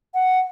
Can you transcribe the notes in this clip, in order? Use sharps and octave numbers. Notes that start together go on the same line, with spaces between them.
F#5